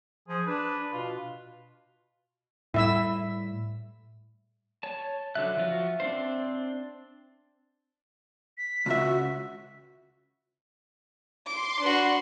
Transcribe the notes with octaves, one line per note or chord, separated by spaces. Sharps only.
F3 G#4
D4 B4
B2 F4
A2 G3 E4 E5 E6
C#5 A5
D3 F#3 E5 F#6
F3 F4 F#4
C4 D4 C5
B6
C#2 F#4 E5
C6 D6
D4 F#4 B4